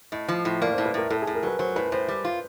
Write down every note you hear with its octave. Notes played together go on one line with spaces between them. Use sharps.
A2 D#5
F3
A2
A#3 D5
C5
A2
B4
A2 A#4
A2 A4
G#4
A2
A#4
F#3 B4
F#3 C5
A2 B4
A2 C5
G3
F4